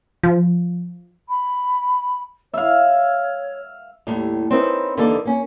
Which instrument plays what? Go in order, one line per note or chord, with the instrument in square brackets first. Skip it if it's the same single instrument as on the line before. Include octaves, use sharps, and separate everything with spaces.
[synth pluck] F3
[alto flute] B5
[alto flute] C#5 [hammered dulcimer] E5 F5
[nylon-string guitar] D#2 A2 G3
C4 C#4 D#4 E4 A#4 B4
D#2 D3 E3 A#3 D#4 A4
A#3 C#4